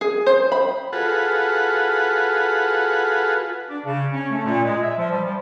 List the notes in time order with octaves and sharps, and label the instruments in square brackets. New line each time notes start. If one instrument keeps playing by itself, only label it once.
[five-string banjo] G#4
C5
B5
[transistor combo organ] F4 F#4 G#4 A4 B4 F#5
[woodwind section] D4
C#3
C#4
A3
A#2
G#3
E5
F3
G3
F3